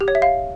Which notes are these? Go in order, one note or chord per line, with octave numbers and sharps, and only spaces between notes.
G4
C#5
E5
F5